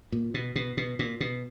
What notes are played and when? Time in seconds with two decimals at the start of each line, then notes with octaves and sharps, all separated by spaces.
0.12 A#2
0.34 B2
0.56 B2
0.77 B2
0.99 A#2
1.20 B2